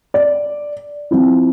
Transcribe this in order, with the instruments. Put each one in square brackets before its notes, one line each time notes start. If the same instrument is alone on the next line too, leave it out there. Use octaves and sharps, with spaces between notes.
[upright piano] D5
F3 C4 E4